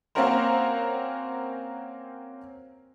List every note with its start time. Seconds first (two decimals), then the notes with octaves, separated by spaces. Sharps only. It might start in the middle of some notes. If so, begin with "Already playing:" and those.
0.15 A#3 C4 C#4 F#4 A#4 C5